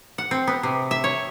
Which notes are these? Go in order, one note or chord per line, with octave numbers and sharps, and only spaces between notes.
F#5
C4
B3
C3
E5
C#5